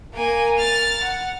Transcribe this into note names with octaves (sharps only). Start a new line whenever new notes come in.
A#3 G#5
F6 A6
F#5